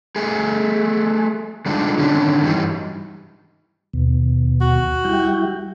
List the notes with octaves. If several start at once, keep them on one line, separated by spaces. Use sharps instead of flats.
A3 G#4
G3 G#3 D4 D#4 F4
D3 D#3 C#4 D4
G2 E3 F#3 G3 D#4
D#2 B2
F#4
G3 E4 G5